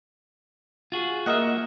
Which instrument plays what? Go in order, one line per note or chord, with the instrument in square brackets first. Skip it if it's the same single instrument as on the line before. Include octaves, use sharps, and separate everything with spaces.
[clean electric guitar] F4 F#4 G#4
[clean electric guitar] A#3 E5 [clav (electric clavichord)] A#4 D#5 F#5